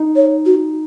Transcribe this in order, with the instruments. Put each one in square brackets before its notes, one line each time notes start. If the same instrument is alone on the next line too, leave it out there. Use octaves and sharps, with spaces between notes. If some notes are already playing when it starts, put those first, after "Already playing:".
Already playing: [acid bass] D#4
[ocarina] C#5
F#4